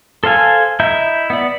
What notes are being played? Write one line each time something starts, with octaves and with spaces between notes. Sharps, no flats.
A4 C5 F5 G#5
E4 D#5 E5 A#5 G6
B3 D5